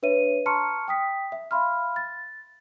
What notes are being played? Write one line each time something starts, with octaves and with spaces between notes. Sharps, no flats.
D4 B4 C#5 E5 D#7
A5 A#5 C6 C#6 F6 C#7
G5 D#6 B6
E5
E5 F5 B5 C6 F6
A6